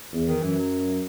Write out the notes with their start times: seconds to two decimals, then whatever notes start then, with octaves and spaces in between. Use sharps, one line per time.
0.12 E2
0.27 D#3
0.42 F#2 E3
0.56 F#3